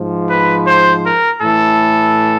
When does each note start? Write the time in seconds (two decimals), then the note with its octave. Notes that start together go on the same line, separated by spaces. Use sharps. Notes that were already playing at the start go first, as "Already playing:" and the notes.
Already playing: G#2 F3
0.29 B4
0.66 C5
1.04 A#4
1.41 A2 E3 A4